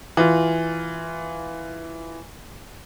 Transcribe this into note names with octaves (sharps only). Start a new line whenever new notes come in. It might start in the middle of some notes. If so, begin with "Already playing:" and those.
E3 F4